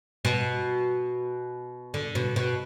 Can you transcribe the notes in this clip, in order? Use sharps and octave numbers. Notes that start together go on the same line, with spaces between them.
B2
D3
B2
B2